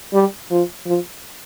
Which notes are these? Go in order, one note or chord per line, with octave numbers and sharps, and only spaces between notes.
G3
F3
F3